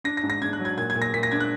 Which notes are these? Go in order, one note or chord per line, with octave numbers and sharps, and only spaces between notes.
D4 A#6
A#6
G#2
A#6
D4 G#6
F#6
F#3
G#6
A#2 G#6
G#6
A#2
A#6
A#2 B6
A#6
D4 G#6
F#6